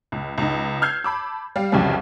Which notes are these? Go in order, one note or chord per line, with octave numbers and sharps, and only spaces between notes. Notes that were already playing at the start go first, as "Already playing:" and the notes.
C#2
C#2 D#4
E6 F6 G6 G#6 C7
A5 B5 D6 E6
G3 F5
C2 F2 C#3 E3 F#3 G3